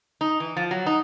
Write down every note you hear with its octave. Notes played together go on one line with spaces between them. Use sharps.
D#4
E3
F3
F#3
D#4